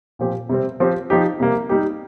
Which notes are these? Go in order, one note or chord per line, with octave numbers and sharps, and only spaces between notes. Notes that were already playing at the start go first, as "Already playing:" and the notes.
A#2 F3 C4 G4
C3 G3 C4
F3 C4 G4
F3 D#4 G4
C3 G3 A#3
G3 D#4 G4